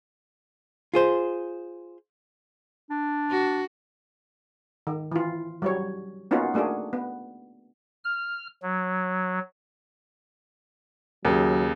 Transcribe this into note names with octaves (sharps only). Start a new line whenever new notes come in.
F4 G#4 C5
D4
F#4
D#3
E3 F4
F#3 G3 C#5
A#3 B3 C#4 D#4 F4 F#4
A3 A#3 D4 F#4 G#4
B3
F6
F#3
D#2 C#3 F#3